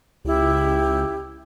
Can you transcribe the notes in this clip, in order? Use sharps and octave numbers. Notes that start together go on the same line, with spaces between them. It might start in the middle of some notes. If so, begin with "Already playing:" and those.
C#2 E4 G4